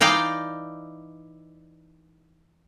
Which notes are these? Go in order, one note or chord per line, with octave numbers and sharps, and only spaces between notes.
E3 D#4 D5 F5 G5